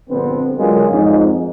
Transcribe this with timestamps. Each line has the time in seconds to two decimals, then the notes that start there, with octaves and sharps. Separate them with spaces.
0.10 A#1 G2 D3 B3 C4
0.58 D3 F#3 G#3 F4 G#4 A#4
0.90 F2 G#2